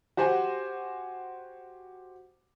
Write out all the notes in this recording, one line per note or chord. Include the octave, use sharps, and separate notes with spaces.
F#4 G4 C5 F#5 G#5